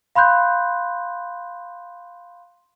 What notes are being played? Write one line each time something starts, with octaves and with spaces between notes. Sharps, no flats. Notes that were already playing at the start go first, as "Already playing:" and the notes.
F5 B5 C6 F#6 G6